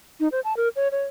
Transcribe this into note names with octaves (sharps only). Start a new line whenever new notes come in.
D#4
C5
A5
A#4
C#5
C#5